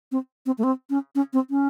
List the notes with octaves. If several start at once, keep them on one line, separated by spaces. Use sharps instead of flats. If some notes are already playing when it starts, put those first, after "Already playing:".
C4
C4
A3
C4
C#4
C#4
C4
C#4